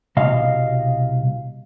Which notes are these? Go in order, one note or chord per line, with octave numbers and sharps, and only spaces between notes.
C2 B2 D#5 F5